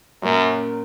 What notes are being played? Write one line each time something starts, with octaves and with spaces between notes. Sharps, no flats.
F#2 A#2 F#3 A#3 C#4